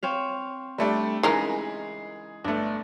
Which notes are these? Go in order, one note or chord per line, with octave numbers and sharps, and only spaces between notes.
C4 C#5 F5
G3 A3 D4
C#3 E3 G#3 D#4 G#4 A#4
G1 A3 D4